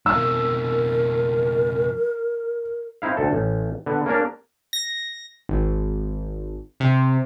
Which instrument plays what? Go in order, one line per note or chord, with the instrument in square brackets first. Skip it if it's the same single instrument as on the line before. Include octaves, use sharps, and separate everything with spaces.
[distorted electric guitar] F2 B2 [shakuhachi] A#4 [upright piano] E6
[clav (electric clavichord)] C4 D#4 E4 F5
D2 A4
A1
D3 B3
A#3 C#4 D4 A#4
[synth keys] A#6
G#1
C3